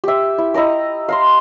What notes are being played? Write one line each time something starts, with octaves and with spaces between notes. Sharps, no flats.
G4 E5
E4
E4 D#5 A#5 D6
F5 A#5 C6